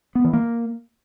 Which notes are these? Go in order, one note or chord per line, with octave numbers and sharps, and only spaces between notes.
B3
E3
A#3